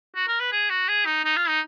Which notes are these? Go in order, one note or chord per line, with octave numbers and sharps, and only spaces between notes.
F#4
A#4
B4
G#4
F#4
G#4
D#4
D#4
F4
D#4